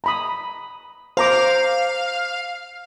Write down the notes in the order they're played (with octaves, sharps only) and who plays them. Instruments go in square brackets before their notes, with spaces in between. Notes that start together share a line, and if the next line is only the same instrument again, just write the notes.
[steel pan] A#5 B5 D#6
[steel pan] C5 A#5 D6 [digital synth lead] F5